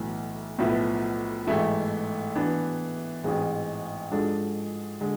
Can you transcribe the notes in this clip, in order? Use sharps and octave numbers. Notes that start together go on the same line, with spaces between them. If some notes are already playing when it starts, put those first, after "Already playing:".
Already playing: B1 A2 E3
B1 A2 F3 B3 E4
A1 G#2 E3 A3 E4
E3 B3 D4
A1 G#2 E3 G#3 C4
G#2 F3 G#3 D4 A4
D3 G#3